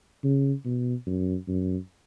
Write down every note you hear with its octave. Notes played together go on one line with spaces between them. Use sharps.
C#3
B2
F#2
F#2